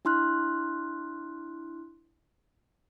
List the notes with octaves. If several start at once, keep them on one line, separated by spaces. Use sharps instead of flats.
D4 E4 C6 F6 F#6